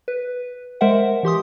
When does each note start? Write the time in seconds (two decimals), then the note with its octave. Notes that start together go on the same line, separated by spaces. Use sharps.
0.08 B4
0.81 G#3 A#4 C5 E5 F#5
1.23 E3 G4 C6 D#6